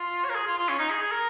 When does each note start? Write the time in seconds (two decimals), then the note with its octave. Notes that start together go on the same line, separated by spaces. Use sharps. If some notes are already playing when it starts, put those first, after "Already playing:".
Already playing: F4
0.24 C#5
0.30 A#4
0.35 G#4
0.47 F4
0.57 F4
0.69 C#4
0.79 D#4
0.90 G#4
1.02 G#4
1.12 A#4